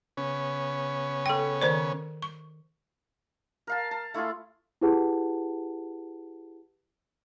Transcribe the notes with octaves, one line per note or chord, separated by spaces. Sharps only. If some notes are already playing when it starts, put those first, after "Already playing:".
C#3 B3 C#4
A4 G5
D#3 C5 D5
C#6
A#4 F5 A5
A5
A3 E4 F4 G#4
E4 G4 G#4 B4 F#5 A5